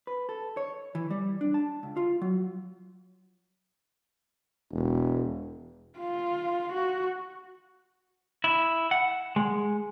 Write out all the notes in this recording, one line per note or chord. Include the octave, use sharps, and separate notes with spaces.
B4
A4
C#5
E3
G3
D4
A5
C#2
F4
F#3
E1
F4
F#4
E4
F#5
G#3